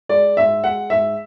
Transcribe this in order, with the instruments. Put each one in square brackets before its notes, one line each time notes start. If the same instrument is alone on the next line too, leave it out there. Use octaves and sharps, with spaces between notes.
[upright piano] G#3 D5
G#2 E5
G#3 F#5
G#2 E5